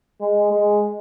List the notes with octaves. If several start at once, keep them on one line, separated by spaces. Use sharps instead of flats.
G#3
G#3